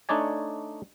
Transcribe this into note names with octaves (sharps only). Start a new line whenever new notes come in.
A3 D4 D#4 C#5 D5 G#5